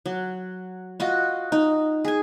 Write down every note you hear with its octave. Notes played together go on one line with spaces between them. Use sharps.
F#3
F4 F#4 D#5
D#4
G#4 G#5